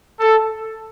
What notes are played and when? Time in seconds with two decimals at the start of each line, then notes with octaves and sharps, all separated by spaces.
0.20 A4